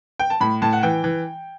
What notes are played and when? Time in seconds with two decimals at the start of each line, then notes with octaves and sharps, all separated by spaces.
0.20 G5
0.30 A5
0.41 A2 B5
0.62 A2 A5
0.73 F#5
0.83 E3 G5
1.04 E3